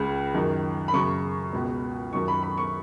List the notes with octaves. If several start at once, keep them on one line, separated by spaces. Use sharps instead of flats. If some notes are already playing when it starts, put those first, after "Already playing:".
Already playing: C#2 C#3
F#2 D#3
B5
F#2 C#3 C#6
C#2 B2
F#2 D#3 C#6
B5
B5
C#6